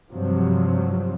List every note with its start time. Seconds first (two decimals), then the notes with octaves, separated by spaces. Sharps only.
0.12 G2 C3 F3 F#3